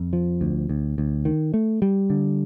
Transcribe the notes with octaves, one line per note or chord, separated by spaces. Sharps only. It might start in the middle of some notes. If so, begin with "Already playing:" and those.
Already playing: F2
F3
D2
D2
D2
D#3
A3
G3
D3